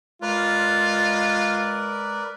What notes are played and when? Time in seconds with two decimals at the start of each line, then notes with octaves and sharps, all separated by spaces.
0.22 G#3 F4 A#4 B4 D5